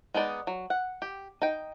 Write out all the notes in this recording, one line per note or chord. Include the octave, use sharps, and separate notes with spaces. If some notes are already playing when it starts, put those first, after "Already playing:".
G#3 B3 D#4 D5
F#3
F#5
G4
D#4 G5